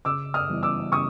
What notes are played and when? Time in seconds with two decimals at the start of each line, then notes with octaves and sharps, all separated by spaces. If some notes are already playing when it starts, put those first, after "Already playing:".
0.05 C#3 D6 E6
0.34 D#6 F6
0.49 E3 G3 B3 E4
0.63 D6 E6
0.92 C#3 C#6 D#6